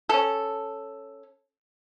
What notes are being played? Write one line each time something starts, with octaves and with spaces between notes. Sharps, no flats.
C#4 A4